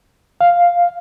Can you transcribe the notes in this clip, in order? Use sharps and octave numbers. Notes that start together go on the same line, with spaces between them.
F5